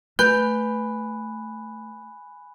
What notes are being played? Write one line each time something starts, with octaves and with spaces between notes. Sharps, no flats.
A3 B4 G#5 B5 F#6 G6